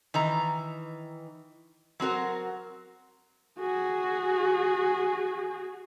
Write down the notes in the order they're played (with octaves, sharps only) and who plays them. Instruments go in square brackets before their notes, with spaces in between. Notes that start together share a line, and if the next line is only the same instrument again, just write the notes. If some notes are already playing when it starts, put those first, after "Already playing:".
[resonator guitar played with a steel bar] D#3 E3 A#5
F#3 C4 F#4 A#4
[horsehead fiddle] F#4 G#4